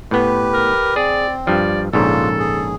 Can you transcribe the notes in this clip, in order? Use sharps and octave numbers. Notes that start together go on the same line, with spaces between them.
A2 B3 G4 B4
A#4
C4 G#4 D5
G2 F3 D5
A#1 G#2 C#3 A#3 D4 F4 A4
G#4